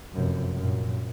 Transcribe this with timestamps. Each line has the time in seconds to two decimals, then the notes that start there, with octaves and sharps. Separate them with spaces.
0.14 F1 F#2
0.54 F#2 A#2